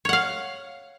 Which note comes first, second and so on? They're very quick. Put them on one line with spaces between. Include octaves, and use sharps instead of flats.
C#5 F#5 F5